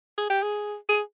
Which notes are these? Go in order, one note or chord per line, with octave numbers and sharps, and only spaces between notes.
G#4
G4
G#4
G#4